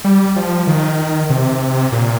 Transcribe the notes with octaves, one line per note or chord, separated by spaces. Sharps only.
G3
F3
D#3
C3
A#2